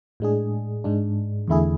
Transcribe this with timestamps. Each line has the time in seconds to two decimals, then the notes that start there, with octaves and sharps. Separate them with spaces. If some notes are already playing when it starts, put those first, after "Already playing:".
0.20 A2 G#3 D4 G#4
0.84 G#2 G#3 D4
1.48 E2 D3 A3 E4 G#4